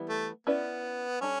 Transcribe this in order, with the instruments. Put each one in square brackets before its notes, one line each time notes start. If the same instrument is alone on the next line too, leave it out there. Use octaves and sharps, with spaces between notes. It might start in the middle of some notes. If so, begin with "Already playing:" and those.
Already playing: [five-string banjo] E3 G3 B3 E4
[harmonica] A3
[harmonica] B3 [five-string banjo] C#4 E4 B4 D5
[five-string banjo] G3 D4 A4 [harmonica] C#4